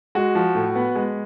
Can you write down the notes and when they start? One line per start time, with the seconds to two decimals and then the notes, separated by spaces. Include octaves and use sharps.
0.15 G#3 F#4
0.35 F3
0.55 A2
0.75 B3
0.95 G#3